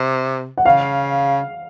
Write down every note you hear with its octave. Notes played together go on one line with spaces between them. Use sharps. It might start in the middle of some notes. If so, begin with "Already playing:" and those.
Already playing: C3
F#5
C#3 F5